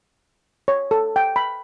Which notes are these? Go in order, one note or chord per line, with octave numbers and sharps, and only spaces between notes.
C#5
A4
G5
B5